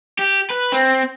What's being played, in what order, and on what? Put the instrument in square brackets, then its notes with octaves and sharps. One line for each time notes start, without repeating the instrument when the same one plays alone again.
[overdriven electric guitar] G4
B4
C4